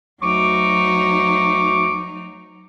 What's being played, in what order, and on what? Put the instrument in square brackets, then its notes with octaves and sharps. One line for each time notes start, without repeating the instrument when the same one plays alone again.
[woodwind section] D2 C#6 D6 [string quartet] F#3 D#4